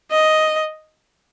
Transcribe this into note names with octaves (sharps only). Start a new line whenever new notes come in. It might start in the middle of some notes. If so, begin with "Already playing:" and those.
D#5